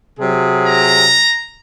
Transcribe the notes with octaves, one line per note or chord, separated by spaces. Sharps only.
C3 F#3 G#4
A#5